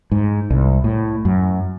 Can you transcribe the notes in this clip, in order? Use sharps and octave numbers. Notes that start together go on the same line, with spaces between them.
G#2
C2
A2
F#2